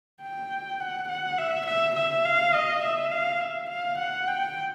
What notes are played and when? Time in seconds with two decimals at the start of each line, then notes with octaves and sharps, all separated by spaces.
0.23 G5
0.80 F#5
1.09 F#5
1.38 E5
1.67 E5
1.96 E5
2.25 F5
2.54 D#5
2.83 E5
3.12 F5
3.41 E5
3.70 F5
3.99 F#5
4.28 G5